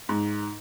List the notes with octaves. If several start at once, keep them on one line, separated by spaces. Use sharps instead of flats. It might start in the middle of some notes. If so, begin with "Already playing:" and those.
G#2